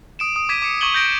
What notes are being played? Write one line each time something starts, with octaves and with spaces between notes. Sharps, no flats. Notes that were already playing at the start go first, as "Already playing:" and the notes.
D#6 D7 E7
D#6
D6 G#6 B6 D#7
D6 C#7
C#6 D6 G#6 D#7 F#7 G7
G6 A#6 D7